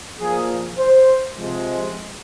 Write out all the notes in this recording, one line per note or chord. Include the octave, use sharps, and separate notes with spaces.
A#2 F3 A#3 G#4
C5
C3 F3 G#3